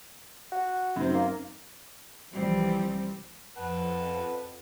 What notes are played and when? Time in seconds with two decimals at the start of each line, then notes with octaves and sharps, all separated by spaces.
0.52 F#4
0.96 F#2 D#3 C4
1.14 A#3
2.33 C2 E3 F3 G3 C4
3.57 F2 B4 F#5 A5